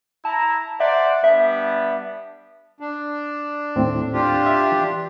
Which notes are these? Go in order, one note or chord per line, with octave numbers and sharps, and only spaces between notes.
E4 A5 A#5
C5 D5 E5 F#5
G3 B3 D4 E5
D4
D#2 A2 C4
D4 F4 G4
E5
E3